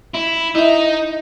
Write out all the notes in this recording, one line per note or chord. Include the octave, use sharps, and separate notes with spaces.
E4
D#4 E4 E5